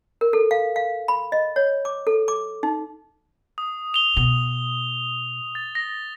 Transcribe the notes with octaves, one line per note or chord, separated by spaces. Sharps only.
A#4
A4
F5
F5
B5
D#5
C#5
D6
A4
D6
D#4
D#6
F7 G7
B2
A6
A#6